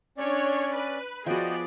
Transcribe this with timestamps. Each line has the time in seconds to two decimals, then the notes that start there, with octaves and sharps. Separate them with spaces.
0.17 C#4 D4 C#5 D5
0.75 B4
1.26 F3 B3 F#4 G#4 D5 D#5 G5